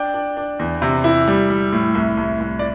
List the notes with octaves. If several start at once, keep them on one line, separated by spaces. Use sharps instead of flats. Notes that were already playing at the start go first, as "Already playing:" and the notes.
Already playing: D4 D5 G5
D4
D4
E2
C3
E4
G3
G3
A2
C2
C2
C2
D5